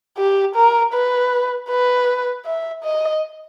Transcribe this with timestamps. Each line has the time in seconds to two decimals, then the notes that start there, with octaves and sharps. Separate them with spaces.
0.18 G4
0.56 A#4
0.93 B4
1.69 B4
2.45 E5
2.83 D#5